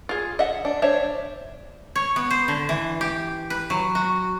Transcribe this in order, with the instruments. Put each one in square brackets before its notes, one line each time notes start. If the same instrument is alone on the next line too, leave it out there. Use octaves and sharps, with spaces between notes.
[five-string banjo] F4 G#4
D#5 E5 F#5
D4
D4 C5 C#5 E5
[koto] C#5
B3
C5
D3
E3
G4
B4
F#3
F#4